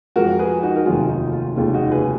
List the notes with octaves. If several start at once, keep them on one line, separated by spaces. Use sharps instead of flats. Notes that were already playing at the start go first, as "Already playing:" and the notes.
F2 F3 G#3 F#4 A#4
G#4 B4
D#4 F#4
A#4
F1 D#2 D#3 F#3 F4 G#4
D#4
F4
F1 D#2 C#3 G#3 F4
D#4 F#4
G#4 B4